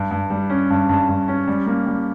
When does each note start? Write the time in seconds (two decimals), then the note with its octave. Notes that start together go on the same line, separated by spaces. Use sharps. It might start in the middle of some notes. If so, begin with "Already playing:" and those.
Already playing: G2
0.11 G2
0.30 G3
0.50 C#4
0.70 G2
0.89 G2
1.09 G2
1.28 C#4
1.48 G3
1.66 A#3
1.86 G3